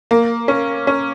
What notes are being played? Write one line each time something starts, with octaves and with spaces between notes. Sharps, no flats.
A#3
C#4
C#4